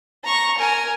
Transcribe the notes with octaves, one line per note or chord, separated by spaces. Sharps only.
A#5 C#6
A#4 G#5